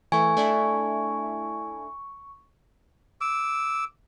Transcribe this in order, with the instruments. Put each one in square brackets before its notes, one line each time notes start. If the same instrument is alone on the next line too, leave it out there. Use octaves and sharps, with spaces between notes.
[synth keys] E3 A3 [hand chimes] G#5 [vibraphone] C#6
[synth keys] A3 D4 E4
[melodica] D6 E6